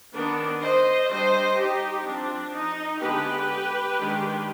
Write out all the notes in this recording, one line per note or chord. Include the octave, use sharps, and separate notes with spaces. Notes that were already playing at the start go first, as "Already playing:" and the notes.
D#3 B3 D4
C5 D#5
G3 D4 C5 D#5
D#4 G4
F3 C4 D4
D#4
D3 G#3 B3 D4 G4 B4
D#3 G#3 D4